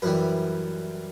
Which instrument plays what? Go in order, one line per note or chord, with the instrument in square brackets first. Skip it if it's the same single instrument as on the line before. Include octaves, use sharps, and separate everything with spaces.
[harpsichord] F#2 E3 G3 B4